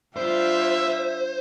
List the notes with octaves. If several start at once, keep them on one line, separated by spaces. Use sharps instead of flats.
G3 D4 F4 C5 E5